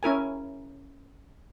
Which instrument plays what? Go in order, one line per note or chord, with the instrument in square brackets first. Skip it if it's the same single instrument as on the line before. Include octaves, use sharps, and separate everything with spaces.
[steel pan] C#4 E4 A#4 G#5